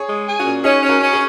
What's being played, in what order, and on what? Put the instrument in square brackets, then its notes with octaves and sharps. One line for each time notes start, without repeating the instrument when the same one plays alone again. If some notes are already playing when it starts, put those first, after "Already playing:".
Already playing: [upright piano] G#4 C#5
[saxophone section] G#3
G#4
[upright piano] C#4 F#4
[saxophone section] A#2
[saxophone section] C#4 [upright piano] D#4 G#4
[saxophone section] C#4
[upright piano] F#4 A#4
[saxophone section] C#4
[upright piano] G#4 C#5